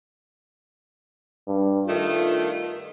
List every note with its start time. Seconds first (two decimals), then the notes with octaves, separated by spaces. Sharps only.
1.48 G2
1.87 G2 D#3 A3 F4